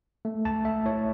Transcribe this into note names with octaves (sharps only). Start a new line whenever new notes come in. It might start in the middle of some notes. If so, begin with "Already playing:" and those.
A3
C#2 A5
A3 E5
E4 C#5